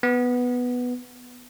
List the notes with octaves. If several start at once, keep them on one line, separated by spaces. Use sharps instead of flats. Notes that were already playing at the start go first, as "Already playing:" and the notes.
B3